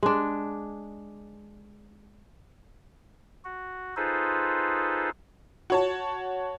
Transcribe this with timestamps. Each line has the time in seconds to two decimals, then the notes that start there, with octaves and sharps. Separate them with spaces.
0.03 G#3 D4
3.45 F#4
3.97 D#4 F4 G#4 A4 B4 C5
5.70 F#4 C#5 A5